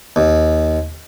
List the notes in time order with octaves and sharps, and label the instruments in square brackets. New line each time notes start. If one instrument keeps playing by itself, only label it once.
[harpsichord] D#2